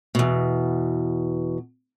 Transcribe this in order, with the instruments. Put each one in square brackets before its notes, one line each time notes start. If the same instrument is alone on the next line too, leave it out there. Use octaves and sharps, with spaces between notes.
[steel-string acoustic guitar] E2 B2